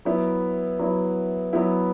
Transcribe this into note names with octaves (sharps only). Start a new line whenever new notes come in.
F#3 B3 E4
F#3 B3 E4
F#3 B3 E4